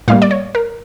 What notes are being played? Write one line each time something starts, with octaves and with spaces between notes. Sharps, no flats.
A2 G3 A#3 F5
D5
C#5
A#4